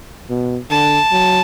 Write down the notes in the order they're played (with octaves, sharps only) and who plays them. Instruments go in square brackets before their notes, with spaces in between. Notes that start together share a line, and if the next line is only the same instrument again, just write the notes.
[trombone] B2
[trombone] D3 [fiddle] A5
[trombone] F#3